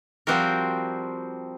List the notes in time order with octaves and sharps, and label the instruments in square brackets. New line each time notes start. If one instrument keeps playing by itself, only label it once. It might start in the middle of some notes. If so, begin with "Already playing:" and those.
[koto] F3 G3 C4 F#4 G4 A#4